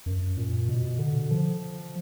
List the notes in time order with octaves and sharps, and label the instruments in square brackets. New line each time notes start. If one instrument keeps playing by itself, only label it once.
[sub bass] F#2
A#2
B2
D3
F3